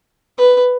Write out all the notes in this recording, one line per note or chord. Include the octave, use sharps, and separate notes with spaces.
B4